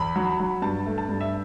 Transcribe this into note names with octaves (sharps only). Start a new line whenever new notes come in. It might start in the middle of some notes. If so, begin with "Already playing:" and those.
Already playing: E2 B5
F#3
F#3
G2 A5
A3
A5
G2
E5